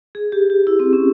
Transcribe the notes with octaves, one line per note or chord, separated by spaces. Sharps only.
G#4
G4
G4
E4
C4
C#4